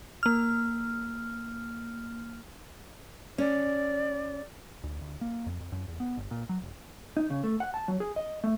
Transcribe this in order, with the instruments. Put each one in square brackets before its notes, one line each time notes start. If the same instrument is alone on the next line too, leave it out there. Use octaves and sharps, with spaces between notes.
[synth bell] A#3 F6
[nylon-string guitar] C#4 [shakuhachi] D5
[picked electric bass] D2
D2
A#3
F2
F2
F#2
E2
B3
G1
A#2
F#3
E1
[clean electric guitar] D#4
C#3
A3
F#5
A5
F#3
G#4
D#5
A3